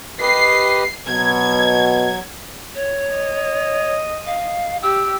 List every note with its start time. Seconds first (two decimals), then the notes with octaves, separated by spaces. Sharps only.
0.20 G4 B4 D#5 C7
1.07 B2 F#3 G#6
2.75 C#5
3.15 D#5
4.26 F5
4.83 G4 E6